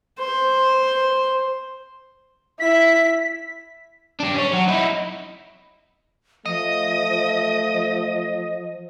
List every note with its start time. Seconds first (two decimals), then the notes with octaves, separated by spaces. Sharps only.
0.20 C5
2.60 E4 B6
4.20 G3 D4
4.35 C#4 C#5
4.53 F#3 F#4
4.68 D#4 E4
6.46 F3 A3 D#5